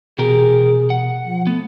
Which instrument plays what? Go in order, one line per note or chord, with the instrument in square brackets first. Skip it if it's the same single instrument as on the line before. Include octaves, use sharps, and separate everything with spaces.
[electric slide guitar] E2 G4 A#4 [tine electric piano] B2 [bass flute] G#4
[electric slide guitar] F#5
[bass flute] F3
[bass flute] A3 [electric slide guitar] B3